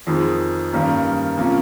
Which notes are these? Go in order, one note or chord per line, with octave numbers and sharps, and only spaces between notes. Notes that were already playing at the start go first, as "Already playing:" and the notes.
F2 D#3 G#3
G2 D#3 G3 A#3 C#4
C3 F3 A#3 C#4